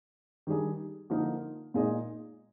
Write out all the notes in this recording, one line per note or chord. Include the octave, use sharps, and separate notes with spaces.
D#3 G3 D4 G#4
D3 F3 A#3 D#4 A#4
A#2 G#3 D#4 G#4 D#5